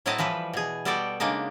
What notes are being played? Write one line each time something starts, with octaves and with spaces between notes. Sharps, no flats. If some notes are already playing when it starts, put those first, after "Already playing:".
A2 F#3 C4 E4 D#5 A5
E3 F3 G3 B4
B2 G#4
G3 B3 F#4 A4 D5 G5
C#3 G#3 A#3 D4 D#4